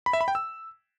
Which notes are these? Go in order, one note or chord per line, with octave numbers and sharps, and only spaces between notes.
B5
E5
B5
G5
E6